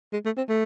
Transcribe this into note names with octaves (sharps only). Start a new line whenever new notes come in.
G#3
A3
C4
A3